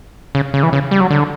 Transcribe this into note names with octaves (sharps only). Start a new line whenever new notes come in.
C#3
C#3
E3
C#3
G3
F#3
D3